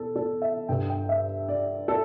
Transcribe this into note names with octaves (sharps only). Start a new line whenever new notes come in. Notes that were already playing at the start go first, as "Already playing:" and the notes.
Already playing: E2 B2 A4
A4
E5
G2 D3 G5
G5
E5
D5
A4